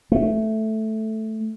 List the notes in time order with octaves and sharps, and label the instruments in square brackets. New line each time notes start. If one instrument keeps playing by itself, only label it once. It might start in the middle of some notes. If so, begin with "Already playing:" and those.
[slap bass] A3